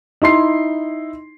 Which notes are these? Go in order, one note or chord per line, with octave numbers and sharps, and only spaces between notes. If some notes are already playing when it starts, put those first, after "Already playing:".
D#4 E4 C6 C7